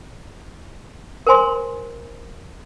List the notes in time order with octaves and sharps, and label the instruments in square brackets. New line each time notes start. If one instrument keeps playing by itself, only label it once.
[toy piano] A#4 C5 G#5 C6